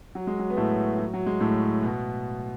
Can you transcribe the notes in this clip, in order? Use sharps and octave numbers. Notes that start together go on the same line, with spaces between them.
F#3
G#3
F#3
B3
A2 A3
F#3
F#3
G#3
A2 A3
B2 B3